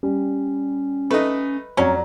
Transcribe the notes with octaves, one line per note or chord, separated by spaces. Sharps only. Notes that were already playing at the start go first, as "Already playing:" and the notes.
G3 C#4
A3 D#4 B4
F2 F#3 C#4 D5 A#5